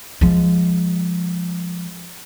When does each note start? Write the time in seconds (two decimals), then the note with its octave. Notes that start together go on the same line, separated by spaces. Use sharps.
0.21 F3 G#3